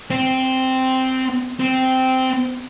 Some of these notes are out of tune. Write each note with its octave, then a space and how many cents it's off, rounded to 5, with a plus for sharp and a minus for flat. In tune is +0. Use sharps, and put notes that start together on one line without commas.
C4 -5
C4 -10